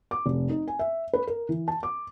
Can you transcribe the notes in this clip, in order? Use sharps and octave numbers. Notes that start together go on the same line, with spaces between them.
D6
F1
D#4
G#5
E5
B4
A#4
E3
A5
D6